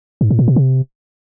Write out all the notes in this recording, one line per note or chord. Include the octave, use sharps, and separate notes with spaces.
G#2
A2
A#2
B2
C3